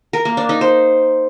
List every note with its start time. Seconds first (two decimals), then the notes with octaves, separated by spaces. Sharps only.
0.13 A#4
0.25 A#3
0.37 D4
0.49 D#4
0.61 C5